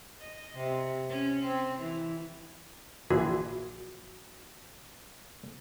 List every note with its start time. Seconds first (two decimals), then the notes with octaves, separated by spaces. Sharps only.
0.19 D#5
0.55 C3
1.09 C#4
1.43 C4
1.79 E3
3.10 A#1 E3 F#4 G#4